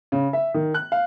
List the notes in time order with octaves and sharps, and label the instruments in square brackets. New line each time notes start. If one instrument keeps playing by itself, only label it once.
[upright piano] C#3
E5
D#3
F#6
F5